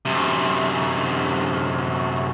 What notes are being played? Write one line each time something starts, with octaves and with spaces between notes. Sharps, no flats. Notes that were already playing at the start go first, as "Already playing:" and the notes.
F#2 C3